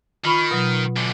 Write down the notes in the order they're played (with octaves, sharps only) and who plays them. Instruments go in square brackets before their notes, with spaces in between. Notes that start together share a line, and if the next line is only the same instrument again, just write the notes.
[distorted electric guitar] D#3 [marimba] F4 B5 C#6
[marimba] B2 F#3
[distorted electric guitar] F#2 D3